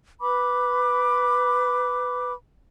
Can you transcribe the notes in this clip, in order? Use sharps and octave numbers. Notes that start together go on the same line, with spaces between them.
B4 B5 D6